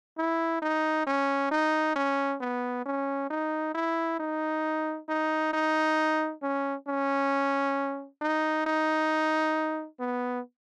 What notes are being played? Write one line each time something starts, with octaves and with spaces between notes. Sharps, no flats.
E4
D#4
C#4
D#4
C#4
B3
C#4
D#4
E4
D#4
D#4
D#4
C#4
C#4
D#4
D#4
B3